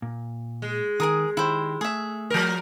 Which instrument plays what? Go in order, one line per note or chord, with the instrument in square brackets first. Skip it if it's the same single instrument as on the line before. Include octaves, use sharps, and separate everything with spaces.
[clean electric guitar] A#2
[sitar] G#3
[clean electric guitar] D#3 [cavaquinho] G#4 A#4 D#6
[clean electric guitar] D#3 G4 [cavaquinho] E4 C5
[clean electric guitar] A3 [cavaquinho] G#4 E5
[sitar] F3 A#4